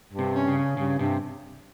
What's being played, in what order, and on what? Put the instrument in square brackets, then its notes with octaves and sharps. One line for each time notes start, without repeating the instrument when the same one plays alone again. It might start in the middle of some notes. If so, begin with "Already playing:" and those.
[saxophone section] G2
[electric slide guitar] C3
[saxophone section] C#4
[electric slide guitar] C#3
[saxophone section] C#4
[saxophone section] G2 [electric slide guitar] C#3
[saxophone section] G2 [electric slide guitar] C3